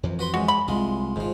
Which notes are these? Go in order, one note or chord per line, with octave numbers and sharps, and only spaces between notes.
F2 E3 F3
F#4 B4 C6
F#2 G#3 F#4
B5
C2 G#3 F4
G#1 G#2 F3